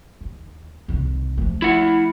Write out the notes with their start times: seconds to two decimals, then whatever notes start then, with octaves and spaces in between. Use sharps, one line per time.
0.21 D#2
0.88 C2 D#3
1.38 F3 A3
1.62 E4 F#5